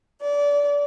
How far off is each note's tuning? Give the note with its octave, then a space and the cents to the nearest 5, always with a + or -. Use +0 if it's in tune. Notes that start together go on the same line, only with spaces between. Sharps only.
D5 -25